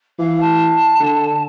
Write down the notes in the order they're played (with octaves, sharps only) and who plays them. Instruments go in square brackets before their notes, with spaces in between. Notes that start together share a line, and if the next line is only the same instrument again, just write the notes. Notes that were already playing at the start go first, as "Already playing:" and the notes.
[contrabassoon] E3 [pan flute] F5
[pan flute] A5
[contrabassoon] D3